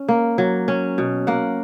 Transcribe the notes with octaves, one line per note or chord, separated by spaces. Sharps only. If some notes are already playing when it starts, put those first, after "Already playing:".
Already playing: C#4
A#3
F#3
C#4
B2
A#3 F#5